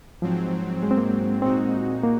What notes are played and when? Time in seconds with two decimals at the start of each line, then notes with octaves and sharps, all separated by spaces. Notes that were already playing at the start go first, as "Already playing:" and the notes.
0.22 G#2 F3 F#3 C4
0.83 G#3
0.91 C4
0.98 A#3
1.42 A#2 G#3 C4 D#4 F#4
2.03 A#3